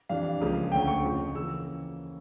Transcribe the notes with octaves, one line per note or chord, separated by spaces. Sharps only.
F2 E3 G3 D4 F5
C#2 C#3 F3 A#3
D2 D3 A3 C#4 G5
C#6
F2 C#3 F3
C#3 E3 A#3 E6